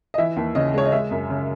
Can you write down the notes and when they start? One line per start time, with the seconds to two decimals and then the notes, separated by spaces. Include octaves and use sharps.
0.14 D#5
0.18 E3 E5
0.36 D#2
0.55 C#3 D#5
0.74 G#3 C#5
0.85 D#5
0.92 G#3 E5
1.11 F#2
1.29 C#3